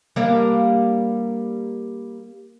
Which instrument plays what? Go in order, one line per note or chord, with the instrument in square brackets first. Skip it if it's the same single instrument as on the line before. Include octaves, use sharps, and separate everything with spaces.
[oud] G3 A#3 D4